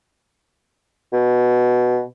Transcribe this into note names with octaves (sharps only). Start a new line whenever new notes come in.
B2